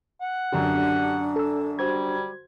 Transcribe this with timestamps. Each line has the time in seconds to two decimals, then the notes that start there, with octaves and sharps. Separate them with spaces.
0.21 F#5
0.53 F#2 D3 D4 G4
1.36 A4 E6
1.79 G3 F#4 C5 G#6